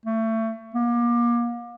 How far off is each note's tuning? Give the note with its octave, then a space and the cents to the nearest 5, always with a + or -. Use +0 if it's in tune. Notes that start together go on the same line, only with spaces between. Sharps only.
A3 +25
A#3 +35